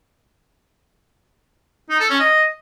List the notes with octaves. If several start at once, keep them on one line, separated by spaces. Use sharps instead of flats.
D#4
A4
C#4
D#5